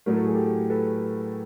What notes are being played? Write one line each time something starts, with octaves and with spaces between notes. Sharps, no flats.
A2 F#3 A3 A#4
A4
G#4
G4 A4
A4 B4